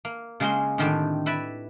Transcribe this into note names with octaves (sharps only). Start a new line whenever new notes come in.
A#3
C#3 G#3 A#3 G#4 C5 C6
A2 D3 D#3 C4 D4 G4
E4 B4 D5 E5